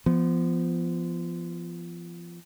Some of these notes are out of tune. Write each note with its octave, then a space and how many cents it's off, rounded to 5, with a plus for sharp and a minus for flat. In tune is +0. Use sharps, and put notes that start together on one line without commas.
F3 -25 B3 +0